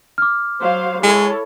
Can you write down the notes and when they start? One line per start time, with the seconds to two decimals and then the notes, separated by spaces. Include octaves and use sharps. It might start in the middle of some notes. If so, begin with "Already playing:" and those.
0.18 D6 F6
0.61 F#3 C5 F5
1.03 G#3 E4 A4 C#5